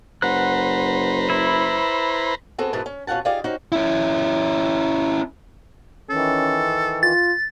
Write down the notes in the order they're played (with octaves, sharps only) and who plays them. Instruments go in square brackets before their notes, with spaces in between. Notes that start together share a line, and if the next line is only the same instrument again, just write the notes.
[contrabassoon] F#1 [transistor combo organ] B4 C5 A#5 [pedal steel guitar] F#5 F#6
[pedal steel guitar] E4
[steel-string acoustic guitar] B3 C4 F#4 G#4 A4
G#2 B2 E3 A#4 B4 A5
C#4
B2 C#4 F4 F#5 A5
D#4 F4 G4 G#4 D5 F5
C#4 D#4 F#4 C5
[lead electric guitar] C#4 E4
[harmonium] D#3 E3 [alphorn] C#4 [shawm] A4
[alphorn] F4 [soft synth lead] A6